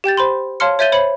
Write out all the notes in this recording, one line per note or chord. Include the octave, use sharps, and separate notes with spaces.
G4 G5 G6 A6
C5 B5 C6
C#5 F5 A5 C6 F6 C#7
C#5 E5 G6 A6 D#7 G7
C5 C#5 B5 C#7 F#7